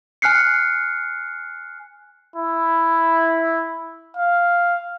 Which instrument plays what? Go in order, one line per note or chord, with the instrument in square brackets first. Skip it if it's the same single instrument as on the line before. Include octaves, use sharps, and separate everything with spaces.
[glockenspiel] G#5 F6 F#6 C7 C#7
[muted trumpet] E4
F5